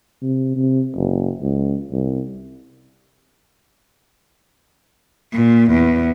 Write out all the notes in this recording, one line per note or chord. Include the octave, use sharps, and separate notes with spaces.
C3
C3
F#1
C#2
C2
A#2
E2